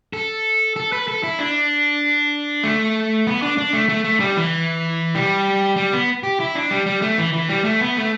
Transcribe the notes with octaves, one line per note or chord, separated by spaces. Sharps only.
A4
A4
B4
A4
E4
D4
A3
B3
D4
D4
A3
A3
A3
G3
E3
G3
G3
B3
G4
E4
D4
G3
G3
A3
E3
E3
G3
A3
B3
A3